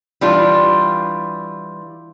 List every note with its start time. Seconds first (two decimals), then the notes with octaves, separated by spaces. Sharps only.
0.21 E3 G3 D4 F4